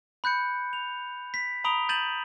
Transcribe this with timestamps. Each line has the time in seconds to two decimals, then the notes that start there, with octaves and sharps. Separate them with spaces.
0.24 B5 F#6 G6 C#7
0.73 F7
1.34 B6
1.64 A#5 B5 D#6 D7 F7 G7
1.89 G6 A6 D#7 E7 F#7